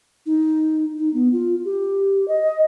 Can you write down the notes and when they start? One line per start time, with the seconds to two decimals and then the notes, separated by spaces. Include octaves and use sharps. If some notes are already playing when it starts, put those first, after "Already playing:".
0.26 D#4
0.98 D#4
1.14 B3
1.32 F4
1.65 G4
2.28 D#5